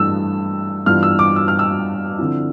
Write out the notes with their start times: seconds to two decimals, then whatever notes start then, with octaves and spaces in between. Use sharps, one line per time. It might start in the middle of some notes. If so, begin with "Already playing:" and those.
Already playing: G2 E3 A3 E4 E6
0.86 G2 E3 B3 F4 F6
1.03 E6
1.19 D6
1.36 E6
1.48 F6
1.59 E6
2.19 D3 F3 C4 E4